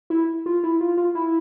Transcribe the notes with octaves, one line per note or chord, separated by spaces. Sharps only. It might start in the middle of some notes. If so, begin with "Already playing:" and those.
E4
F4
E4
F4
F4
E4